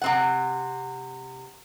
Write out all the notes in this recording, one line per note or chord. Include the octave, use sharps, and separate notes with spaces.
C3 C4 F#5